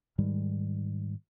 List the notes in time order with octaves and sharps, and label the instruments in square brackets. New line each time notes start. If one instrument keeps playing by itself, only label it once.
[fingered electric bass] G#2 D#3 G3 G#3